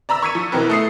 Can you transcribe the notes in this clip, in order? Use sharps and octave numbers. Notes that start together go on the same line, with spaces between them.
D5 A#5 B5 E6
C#6 E6 G#6 B6 C#7 D#7
F3
B2 E3 C4 A#4 B4
A3 D#6 C7